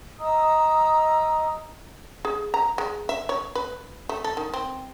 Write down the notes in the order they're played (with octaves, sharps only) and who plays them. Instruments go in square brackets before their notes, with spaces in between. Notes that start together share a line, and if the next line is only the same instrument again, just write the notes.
[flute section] D#5 A#5 D#6 E6
[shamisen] G#4
A#5
G#3
E5
C#5
B4
A3
A4
D#3
C4